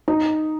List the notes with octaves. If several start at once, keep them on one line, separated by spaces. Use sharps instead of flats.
D#4